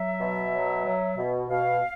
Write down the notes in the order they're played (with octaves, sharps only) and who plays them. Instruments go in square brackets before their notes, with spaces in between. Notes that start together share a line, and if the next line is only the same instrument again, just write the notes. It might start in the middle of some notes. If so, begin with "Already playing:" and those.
Already playing: [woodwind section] F#3 E5
B2
F#3
F#3
B2
B2 F5